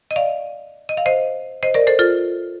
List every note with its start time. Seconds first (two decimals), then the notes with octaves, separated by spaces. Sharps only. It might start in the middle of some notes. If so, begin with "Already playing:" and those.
0.11 D#5
0.16 D5 F5
0.89 D#5
0.97 F5
1.06 C5 D#5
1.63 C5 D#5
1.74 A#4 D5
1.87 A4 C5
1.99 F4 A4